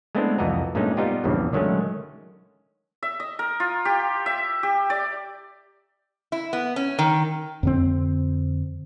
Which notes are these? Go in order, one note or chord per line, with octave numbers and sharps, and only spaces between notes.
G#3 A3 B3 C4 D4 E4
C2 F2 E3 F#4 D#5 A#5
G2 A#2 G#3 A3 C#4 D#4
G3 B3 D#4 F4 G4
A#1 E2 G2 C#3
D3 D#3 F#3 G#3 A3 C#4
E5
D#5
A#4
F4
G4
E5
G4
D5
E4
B3
C#4
D#3
F2 D3 C4